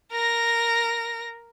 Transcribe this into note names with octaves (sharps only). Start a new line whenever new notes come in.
A#4 A#6